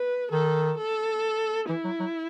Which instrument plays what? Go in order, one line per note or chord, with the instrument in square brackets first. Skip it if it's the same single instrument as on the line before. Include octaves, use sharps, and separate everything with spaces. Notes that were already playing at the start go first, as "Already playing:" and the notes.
Already playing: [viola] B4
[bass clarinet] D#3 [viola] A4
[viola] A4
[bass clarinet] E3 [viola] E4
[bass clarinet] F#3
F#3